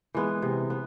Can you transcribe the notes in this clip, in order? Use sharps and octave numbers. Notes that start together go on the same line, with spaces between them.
E3 G#3 B3
C3
B3